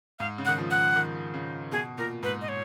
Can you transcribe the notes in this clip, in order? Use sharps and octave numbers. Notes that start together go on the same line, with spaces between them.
G#2 F5
C#3
F#5
D#3
F3
F#5
D#3
C#3
B2 G#4
A#2 A#4
G#2 B4
D#5
C#5